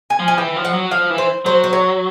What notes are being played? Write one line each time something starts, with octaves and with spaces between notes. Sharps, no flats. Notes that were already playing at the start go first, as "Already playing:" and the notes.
G#5
F3
G#5
E3 G5
F3
F#5
F#3
F3 F5
E3
C5
F#3 C5
C5
C#5